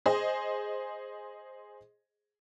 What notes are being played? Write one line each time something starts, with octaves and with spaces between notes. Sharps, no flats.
G#4 C5 D#5